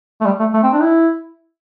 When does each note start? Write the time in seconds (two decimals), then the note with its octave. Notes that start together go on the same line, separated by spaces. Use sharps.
0.21 A3
0.25 G3
0.40 A3
0.54 A3
0.63 C4
0.73 D4
0.82 E4